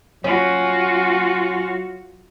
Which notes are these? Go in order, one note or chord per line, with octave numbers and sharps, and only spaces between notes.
F#3 C#4 F4 F#4